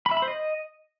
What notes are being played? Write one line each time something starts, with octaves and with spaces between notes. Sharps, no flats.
B5
E5
B5
C5
D#5